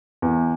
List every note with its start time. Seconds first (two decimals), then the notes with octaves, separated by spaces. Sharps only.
0.22 E2